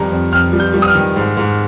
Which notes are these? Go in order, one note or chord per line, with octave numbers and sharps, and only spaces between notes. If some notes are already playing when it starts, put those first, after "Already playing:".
Already playing: F2 D#3 G3 A#5
F2
F2 F6
G3
G6
G3
D#6
F6
D#3
G#2
G#2